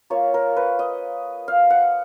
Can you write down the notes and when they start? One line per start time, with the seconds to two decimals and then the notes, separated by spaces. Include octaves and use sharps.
0.10 A#3 F4 C#5
0.34 A#4
0.57 B4
0.79 D#5
1.48 F5
1.70 F#5